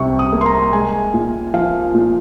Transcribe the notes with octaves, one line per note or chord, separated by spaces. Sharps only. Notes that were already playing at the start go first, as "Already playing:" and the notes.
Already playing: C2 C3 G3 C#6
D#6
A#3
C6
A#5
G#3 G#5
A#2
F3 F5
A#2